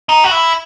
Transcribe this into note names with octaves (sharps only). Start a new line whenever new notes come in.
D#4
F#4
E4